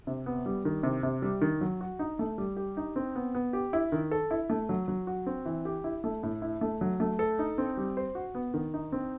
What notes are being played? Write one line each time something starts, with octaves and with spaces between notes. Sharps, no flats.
C3
B3
G3
D#3
C3
C3
G3
D#3
F#3
F#4
D#4
A3
G3
G4
D#4
C4
B3
B3
G4
E4
D#3
A4
E4
A3
F#3
F#3
F#4
C4
E3
G4
E4
A3
A2
E4
A3
F#3
A3
A4
D#4
C4
G3
C5
F#4
B3
D#3
D#4
C4